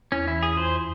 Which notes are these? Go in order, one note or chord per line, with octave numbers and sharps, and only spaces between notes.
E2 C#4
E3 E4
E2 G#4
F2 C5